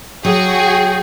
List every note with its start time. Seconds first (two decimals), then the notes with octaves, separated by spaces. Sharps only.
0.25 F#3 F#4 G#4 G5